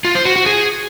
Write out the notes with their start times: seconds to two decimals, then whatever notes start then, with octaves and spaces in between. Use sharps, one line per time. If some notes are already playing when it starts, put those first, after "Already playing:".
0.05 F4
0.15 C5
0.25 F#4
0.36 F#4
0.46 G#4